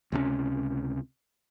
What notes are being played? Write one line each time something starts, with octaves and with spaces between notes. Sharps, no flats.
C#2 C3 G3 C#4